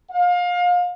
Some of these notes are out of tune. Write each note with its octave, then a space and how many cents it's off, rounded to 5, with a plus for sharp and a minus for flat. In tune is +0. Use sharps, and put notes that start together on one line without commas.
F5 +30